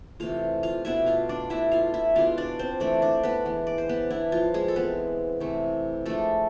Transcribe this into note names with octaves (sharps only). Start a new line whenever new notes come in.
C3 E3 A3 F4 F5
F4 F5
B2 B3 D4 E4 E5
F4 F5
D4 D5
B2 A3 D4 E4 E5
F4 F5
E4 E5
B2 G#3 B3 D4 F4 F5
D4 D5
C4 C5
E3 A3 C4 D4 D5
D4 D5
B3 B4
E3 G#3 B3
D5
C5
B3 B4
E3 B3 D4 E4
F3 F4
G#3 G#4
A4
E3 G#3 B3 C4 B4
C3 E3 A3
F3 G#3 A3 D4 A4